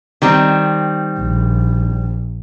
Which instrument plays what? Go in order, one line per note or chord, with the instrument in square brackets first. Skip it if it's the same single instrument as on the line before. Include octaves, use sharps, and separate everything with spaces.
[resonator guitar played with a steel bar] D#3 G3 C4
[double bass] A#1